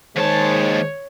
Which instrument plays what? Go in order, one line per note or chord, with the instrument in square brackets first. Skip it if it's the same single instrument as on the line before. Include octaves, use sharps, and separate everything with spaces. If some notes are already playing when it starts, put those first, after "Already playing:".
[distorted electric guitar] D#2 A5 [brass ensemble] D#3 G#3 [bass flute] C5 [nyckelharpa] C#5